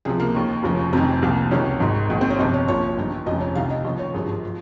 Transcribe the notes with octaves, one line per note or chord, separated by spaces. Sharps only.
C#2 C3 F3 G#4
A#3
D#2 D#3
F1 D#2 C#3 F3
F1 F2 D#3 C4
C2 A#2 F3
C#2 C3 D#3 C#4
G#1 G#2 D#3
A#1 G#2 D#3
C4
C#4
G1 F2 C3 D#4
C#5
A#1 A#2 F3 C#5
G1 G2 D#3
F1 F2 C#3 F3 D#5
C#5
C2 C3 D#3 F5
D#5
D#2 C#3 F3 D#5
C#5
G#1 G2 F3 G#4
F3